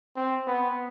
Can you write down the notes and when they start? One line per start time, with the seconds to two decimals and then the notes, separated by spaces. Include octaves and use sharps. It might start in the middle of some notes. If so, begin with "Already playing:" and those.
0.16 C4
0.47 B3